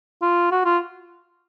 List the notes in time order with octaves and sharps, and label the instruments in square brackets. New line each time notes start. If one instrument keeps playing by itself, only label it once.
[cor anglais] F4
F#4
F4